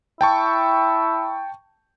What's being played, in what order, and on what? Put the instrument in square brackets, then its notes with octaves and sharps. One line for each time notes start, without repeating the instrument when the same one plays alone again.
[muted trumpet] E4 [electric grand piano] G5 A5 C#6